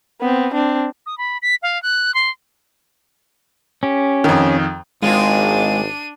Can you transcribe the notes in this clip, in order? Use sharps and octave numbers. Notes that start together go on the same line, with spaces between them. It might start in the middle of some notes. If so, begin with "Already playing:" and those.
B3 C4
C4 D4
D#6
B5
B6
F5
F#6
C6
C#4 G4
F2 D#3
G#1 G#3 C4 D4 F4 D#7